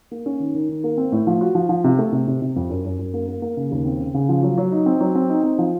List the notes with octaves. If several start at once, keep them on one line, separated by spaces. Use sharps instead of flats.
A#3
C#4
D#3
D#3
D#3
A#3
C4
A2
F3
F#4
F3
F3
C3
A3
C3
C3
C3
F2
F#2
F#2
F#2
A#3
A#3
A#3
C#3
D#2
C4
C#3
C#3
F3
F#3
F#3
D#4
C4
F#3
C4
D#4
C4
F3